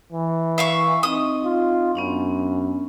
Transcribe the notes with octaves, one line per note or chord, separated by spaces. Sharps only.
E3
E5 F5 C#6
C4 D#4 D#5 D#6
F4
F#2 B3 C#4 D4